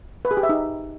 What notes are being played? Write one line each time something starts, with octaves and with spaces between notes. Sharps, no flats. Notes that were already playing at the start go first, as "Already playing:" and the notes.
B4
G#4
G4
E5
D#4